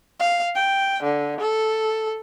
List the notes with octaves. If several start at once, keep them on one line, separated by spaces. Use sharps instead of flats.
F5
G5
D3
A4